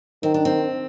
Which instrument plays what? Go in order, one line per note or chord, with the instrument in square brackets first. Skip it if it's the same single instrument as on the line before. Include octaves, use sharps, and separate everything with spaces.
[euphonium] D#3 [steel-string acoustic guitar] C4
[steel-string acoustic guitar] D4
C4